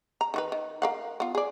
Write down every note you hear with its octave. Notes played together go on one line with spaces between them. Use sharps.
A#5
D#3 F#4 B4
D#3
A#4 F5 F#5
B3 F4
G#4 D5